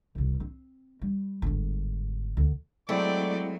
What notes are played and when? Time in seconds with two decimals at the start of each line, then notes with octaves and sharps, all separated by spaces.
0.15 D#1 C2
0.40 C4
1.02 G3
1.42 G1 G#2
2.37 D2
2.89 F#3 G#3 A3 C4 E4 D5 G5